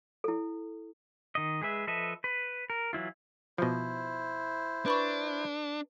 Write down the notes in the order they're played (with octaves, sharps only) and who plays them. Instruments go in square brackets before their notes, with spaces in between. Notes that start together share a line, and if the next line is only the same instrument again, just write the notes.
[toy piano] E4 A4
[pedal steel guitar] D#3 D#5
G#3 G#4 B4 E5
F3 A4 B4 D#5 E5
B4
A#4
E3 F#3 E4 F4
[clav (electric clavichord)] B2 F3 [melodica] E4 C5
[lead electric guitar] D4 [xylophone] B4 B5 C#6